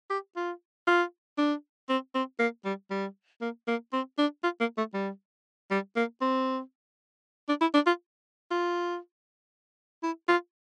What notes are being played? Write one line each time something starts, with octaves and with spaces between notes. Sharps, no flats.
G4
F4
F4
D4
C4
C4
A#3
G3
G3
A#3
A#3
C4
D4
F4
A#3
A3
G3
G3
A#3
C4
D4
E4
D4
F4
F4
E4
F4